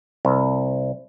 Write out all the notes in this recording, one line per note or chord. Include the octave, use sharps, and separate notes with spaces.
C2